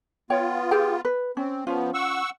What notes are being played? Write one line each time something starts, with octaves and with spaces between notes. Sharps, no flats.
B3 F4 C#5 G5
G4 G#4 G5
B4
C4 C#4
F3 B3 C#4 F4
F#5 C#6 E6